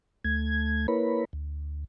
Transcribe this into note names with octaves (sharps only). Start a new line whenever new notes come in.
D2 A3 G#6
A#3 E4 A#4 B4 C#5 B5
D2